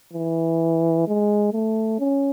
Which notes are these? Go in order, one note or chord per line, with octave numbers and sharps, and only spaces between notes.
E3
G#3
A3
C#4